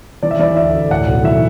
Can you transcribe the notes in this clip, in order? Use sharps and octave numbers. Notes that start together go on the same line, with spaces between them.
E3 D5
E5
E3 D5
D2 E5
D2
A2 F#5
B1
E3 E5